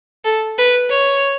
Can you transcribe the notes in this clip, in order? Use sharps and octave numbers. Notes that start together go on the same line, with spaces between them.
A4
B4
C#5